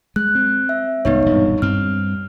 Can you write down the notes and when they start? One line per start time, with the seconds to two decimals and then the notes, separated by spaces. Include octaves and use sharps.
0.16 G#3 F#6
0.35 C4
0.69 E5
1.05 C2 G#2 B3 D#4 C#5
1.26 E1 G2 A#2
1.62 G2 C4 F6